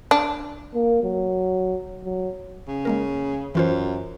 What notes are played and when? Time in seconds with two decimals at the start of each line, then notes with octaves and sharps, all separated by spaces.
0.11 D4
0.74 A#3
1.04 F#3
2.05 F#3
2.68 C#3
2.85 G#3 A#3 A#4
3.55 F#2 E3 F4 C5